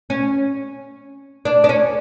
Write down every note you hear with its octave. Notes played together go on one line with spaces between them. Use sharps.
C#4
D4
D4
C#4